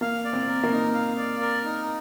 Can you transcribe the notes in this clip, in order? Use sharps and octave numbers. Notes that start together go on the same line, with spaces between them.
A#3 F5
D5
C4
A#4
A#3
D#4
F5
D5
A#4
D#4